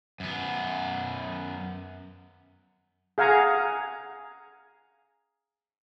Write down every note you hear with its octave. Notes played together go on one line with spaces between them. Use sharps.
F#2 B3
G#4 F5 F#5 G#5 A#5